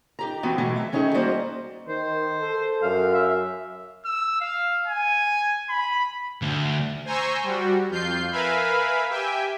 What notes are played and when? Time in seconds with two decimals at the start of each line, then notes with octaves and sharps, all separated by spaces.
0.19 D#4 G4 A#5
0.43 E3 B3 C4 F#4
0.58 B2 E3 F#3 G#3 A3 F4
0.76 E5
0.92 D#3 C#4 D#4 E4 F#4 G#4
1.14 G3 A#3 F#4 C5 D#5
1.88 D#3 C5
2.40 A4
2.82 F#2 F5
3.14 E5
4.05 E6
4.41 F5
4.87 G#5
5.69 B5
6.42 D2
7.05 C5 G#5 A#5 C6 C#6 E6
7.43 G3 F#4
7.90 F2 F4 G6 C7
8.32 A#4 B4 E5 F5 G#5 B5
9.10 G4 E5 G5 G#5